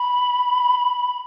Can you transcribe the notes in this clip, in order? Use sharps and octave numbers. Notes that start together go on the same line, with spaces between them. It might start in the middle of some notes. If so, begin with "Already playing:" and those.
Already playing: B5